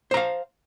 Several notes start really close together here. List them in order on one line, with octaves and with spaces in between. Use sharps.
C5 A#5 F5